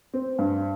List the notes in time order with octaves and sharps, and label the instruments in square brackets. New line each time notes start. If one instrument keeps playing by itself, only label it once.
[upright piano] C4
G2